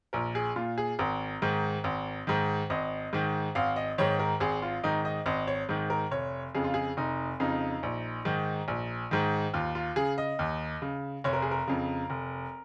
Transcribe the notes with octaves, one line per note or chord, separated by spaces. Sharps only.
A#1 A#4
G#4
A#2 F4
G#4
G#1 A#4
G#2 D#3
G#1
G#2 D#3
G#1 D#5
G#2 D#3
G#1 F5
D#5
G#2 D#3 C#5
A#4
G#1 G#4
F4
G#2 D#3 D#4
D#5
G#1 D#5
C#5
G#2 D#3
A#4
F1 C#5
F2 C#3 G#4
F4
G#4
F1 D#4
F2 C#3 D#4
A#1
G#2 D#3
A#1
G#2 D#3
D#2 F4
F4
C#3 G#4
D#5
D#2
C#3
F1 C#5
A#4
G#4
A#4
F2 C#3
F1